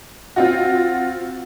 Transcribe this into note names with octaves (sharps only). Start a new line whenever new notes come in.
C4 F4 F#4